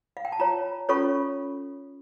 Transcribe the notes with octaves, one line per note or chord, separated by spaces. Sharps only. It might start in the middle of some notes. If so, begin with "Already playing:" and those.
F5
G5
A5
F4 C#5 A#5
C#4 F4 A4 C#5 C#6